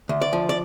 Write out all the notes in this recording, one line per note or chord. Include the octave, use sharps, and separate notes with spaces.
D2
D5
F3
D5